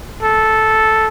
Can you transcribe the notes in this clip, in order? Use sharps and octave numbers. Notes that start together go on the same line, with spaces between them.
A4